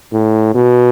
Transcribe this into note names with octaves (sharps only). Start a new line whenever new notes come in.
A2
B2